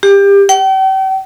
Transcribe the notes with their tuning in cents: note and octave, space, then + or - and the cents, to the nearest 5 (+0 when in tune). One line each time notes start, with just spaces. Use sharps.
G4 +25
G5 -40